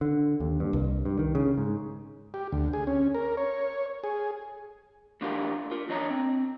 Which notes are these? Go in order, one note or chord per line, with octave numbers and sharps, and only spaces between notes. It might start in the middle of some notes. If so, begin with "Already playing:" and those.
D3
D#2
G2
C2
G2
D#3
C#3
G#2
G4
D2
G#4
C#4
A#4
C#5
G#4
A2 E3 D4 F4 G4 A#4
F4 A#4
E3 D4 C#5 D#5 A#5
C4